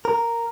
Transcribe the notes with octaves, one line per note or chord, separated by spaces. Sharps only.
A#4